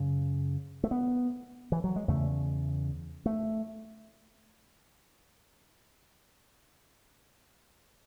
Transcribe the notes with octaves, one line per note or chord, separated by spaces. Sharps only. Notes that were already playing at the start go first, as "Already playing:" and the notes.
Already playing: F#2 C#3
A3
B3
E3
F#3
G#3
E2 C#3 A3
A3